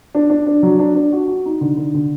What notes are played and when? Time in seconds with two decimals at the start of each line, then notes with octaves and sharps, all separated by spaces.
0.15 D4
0.30 D4
0.47 D4
0.63 F#3
0.79 D4
0.95 D4
1.12 F#4
1.28 F#4
1.45 D#4
1.61 D3
1.77 D3
1.94 D3